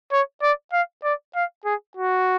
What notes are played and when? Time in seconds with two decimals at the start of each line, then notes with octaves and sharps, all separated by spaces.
0.12 C#5
0.43 D5
0.73 F5
1.04 D5
1.35 F5
1.65 G#4
1.97 F#4